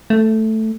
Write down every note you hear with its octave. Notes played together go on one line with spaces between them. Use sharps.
A3